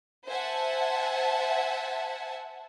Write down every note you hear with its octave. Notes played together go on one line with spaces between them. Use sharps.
C5 E5 F#5 G#5 A5